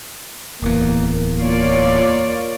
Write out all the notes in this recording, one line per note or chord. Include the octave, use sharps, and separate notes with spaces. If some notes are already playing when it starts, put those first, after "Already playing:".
D1 E2 A#3
A#3 F4 C#5 D5